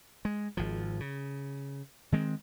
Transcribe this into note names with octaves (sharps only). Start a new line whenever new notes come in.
G#3
G#1 F3
C#3
D#3 G#3 C4